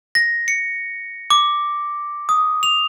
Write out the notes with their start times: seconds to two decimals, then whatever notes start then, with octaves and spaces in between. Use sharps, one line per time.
0.15 A#6
0.48 C#7
1.30 D6
2.29 D#6
2.63 F7